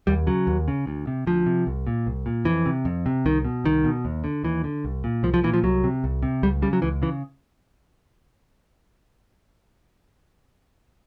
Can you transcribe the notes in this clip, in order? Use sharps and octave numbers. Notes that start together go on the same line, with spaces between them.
D#2 G3
C#3 F#3
D#2
C#3
D2
C3
D2 F3
C3
C2
A#2
C2
A#2
F2 E3
C3
F2
C3
C2 D#3
B2
C2 D#3
B2
D#2
D3
D#2 E3
D3
C2
A#2
C2 F3
F3
A#2 E3
F3
C2 F#3
C3
C2
C3
C#2 G3
C#3 G3
F#3
C#2 E3
C#3 E3